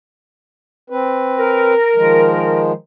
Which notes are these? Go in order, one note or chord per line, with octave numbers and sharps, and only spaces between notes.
C4 B4
A#4
D#3 F3 G#3